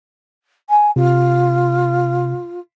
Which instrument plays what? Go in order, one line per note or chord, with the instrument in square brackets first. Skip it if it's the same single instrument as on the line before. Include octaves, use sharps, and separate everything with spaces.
[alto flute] G#5
[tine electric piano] C3 [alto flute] F4